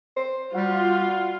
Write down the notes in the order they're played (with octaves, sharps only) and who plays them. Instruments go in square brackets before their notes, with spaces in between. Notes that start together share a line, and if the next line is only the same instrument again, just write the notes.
[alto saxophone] C5
[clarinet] G3 [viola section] F4 [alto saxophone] F#4